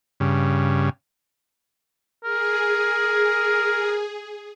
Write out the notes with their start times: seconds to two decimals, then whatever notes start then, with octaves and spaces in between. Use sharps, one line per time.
0.20 G2 C#3
2.24 G#4 A#4